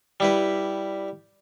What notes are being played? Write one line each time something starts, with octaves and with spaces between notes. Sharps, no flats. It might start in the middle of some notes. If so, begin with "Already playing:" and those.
G3 E4 B4